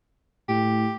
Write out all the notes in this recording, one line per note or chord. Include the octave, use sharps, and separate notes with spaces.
A2 G4